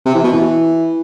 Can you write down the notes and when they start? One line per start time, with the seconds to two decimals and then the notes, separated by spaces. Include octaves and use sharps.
0.06 C3
0.15 E3
0.24 B2
0.33 E3